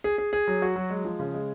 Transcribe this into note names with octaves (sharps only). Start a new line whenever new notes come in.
G#4
G#4
G#4
F#3
F#4
F#3
G#3
F3
C#3
G#3